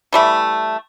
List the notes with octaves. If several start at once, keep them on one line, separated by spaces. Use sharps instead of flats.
E3 G3 A3